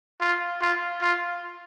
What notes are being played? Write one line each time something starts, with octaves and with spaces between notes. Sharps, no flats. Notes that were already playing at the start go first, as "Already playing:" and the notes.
F4
F4
F4